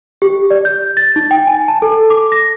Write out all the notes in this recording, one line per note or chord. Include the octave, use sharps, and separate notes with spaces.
G4
D5
G6
A6
D#4
G5
G#5
A5
A4
D6
A#6